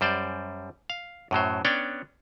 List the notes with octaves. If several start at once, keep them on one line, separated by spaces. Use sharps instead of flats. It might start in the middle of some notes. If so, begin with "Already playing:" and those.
F#2 G3 C5 D5
F5
F#2 A2 F#3 C5
B3 C#4 D4 C#5 D5 G5